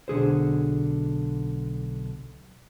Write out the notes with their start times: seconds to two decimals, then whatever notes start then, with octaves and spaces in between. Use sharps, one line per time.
0.08 B1 D3 G#4 C5